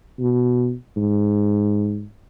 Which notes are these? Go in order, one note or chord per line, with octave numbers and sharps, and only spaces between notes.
B2
G#2